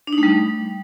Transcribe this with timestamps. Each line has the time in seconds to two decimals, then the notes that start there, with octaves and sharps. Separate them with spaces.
0.07 D4
0.13 D#4
0.18 A3
0.23 G3
0.28 A3